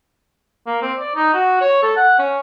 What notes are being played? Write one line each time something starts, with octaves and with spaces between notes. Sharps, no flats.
A#3
C4
D5
D#4
F#4
C#5
A4
F#5
C#4